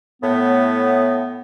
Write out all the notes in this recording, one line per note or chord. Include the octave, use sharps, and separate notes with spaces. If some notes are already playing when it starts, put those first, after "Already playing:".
A2 B3